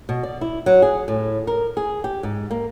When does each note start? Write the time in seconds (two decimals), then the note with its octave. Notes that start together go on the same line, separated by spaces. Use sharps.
0.09 B2
0.23 D5
0.41 E4
0.66 F#3
0.82 G#4
1.08 A2
1.47 A#4
1.77 G#4
2.04 G4
2.23 G#2
2.51 A#3